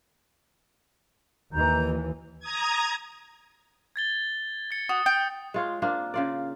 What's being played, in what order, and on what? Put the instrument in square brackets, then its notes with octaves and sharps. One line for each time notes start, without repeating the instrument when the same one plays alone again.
[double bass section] D#2 E3 [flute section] A#5 G6
[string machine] A#5 D#6 G#6
[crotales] G#6 A6 G7
A6 C#7
[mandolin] F#4 [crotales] D#6
[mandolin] G5
[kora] G#3 F4 C#5
A#3 C4 D4 F4
C#3 F4 D5